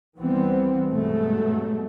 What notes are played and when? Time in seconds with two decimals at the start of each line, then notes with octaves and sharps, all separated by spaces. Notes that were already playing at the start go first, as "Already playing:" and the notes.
0.18 C2 E3 G3 B3 C4
0.90 G2 B2 F#3 G#3 A3